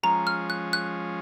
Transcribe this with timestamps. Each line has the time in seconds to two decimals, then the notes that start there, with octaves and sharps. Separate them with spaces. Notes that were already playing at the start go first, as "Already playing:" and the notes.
0.03 F3 G#3 C#4 A#5
0.27 F6
0.50 F#6
0.73 F#6